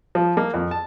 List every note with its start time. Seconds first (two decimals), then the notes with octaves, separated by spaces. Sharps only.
0.15 F3
0.37 A#3
0.54 F2
0.71 A5